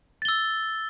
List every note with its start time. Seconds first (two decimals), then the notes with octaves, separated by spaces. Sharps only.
0.22 A6
0.25 G7
0.28 E6